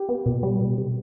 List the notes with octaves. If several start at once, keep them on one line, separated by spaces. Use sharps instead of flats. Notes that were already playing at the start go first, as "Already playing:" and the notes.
Already playing: G4
B3
B2
G3
B2
C3